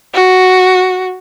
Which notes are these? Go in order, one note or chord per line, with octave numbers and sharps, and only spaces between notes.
F#4